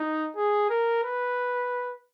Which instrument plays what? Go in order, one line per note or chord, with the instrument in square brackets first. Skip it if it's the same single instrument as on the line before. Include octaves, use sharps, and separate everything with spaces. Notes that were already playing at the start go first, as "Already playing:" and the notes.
Already playing: [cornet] D#4
G#4
A#4
B4